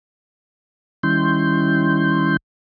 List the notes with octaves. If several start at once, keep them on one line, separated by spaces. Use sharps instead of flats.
D#3 G3 C#4 E4 C6 G6